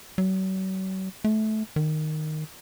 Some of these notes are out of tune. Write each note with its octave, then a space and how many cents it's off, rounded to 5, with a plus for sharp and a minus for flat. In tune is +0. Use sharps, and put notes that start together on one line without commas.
F#3 +40
A3 -20
D#3 -10